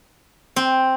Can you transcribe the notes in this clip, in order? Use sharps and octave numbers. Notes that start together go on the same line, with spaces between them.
C4